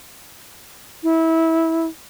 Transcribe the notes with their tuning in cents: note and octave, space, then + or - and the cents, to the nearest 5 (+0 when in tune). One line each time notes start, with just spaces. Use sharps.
E4 -20